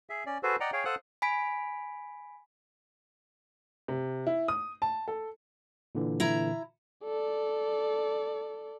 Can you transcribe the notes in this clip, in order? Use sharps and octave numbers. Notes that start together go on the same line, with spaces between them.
G#4 E5
C#4 D5
F#4 G#4 A4 B4 C5
D5 D#5 F#5 G5 A#5
G#4 C#5 F5 G5
A4 C5 F5 F#5 D#6 F#6
G#5 B5 B6 D7
C3
E4
D#6
A5
A4
A#2 D3 E3
E4 A#5
A4 D5